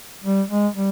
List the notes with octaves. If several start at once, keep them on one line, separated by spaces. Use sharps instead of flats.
G3
G#3
G3